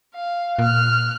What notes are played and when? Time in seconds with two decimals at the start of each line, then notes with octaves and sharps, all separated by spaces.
0.15 F5
0.59 A#2 F6 F#6